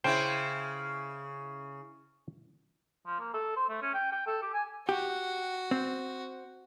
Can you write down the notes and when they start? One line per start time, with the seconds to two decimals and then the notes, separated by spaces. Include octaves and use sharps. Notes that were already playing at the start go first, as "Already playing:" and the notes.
0.04 C#3 E4 C5 G5
3.06 F3
3.20 A#3
3.34 A4
3.56 C5
3.69 A3
3.82 C#4
3.94 G5
4.12 G5
4.27 A4
4.42 G4
4.53 G#5
4.89 F#4 G4
5.71 C4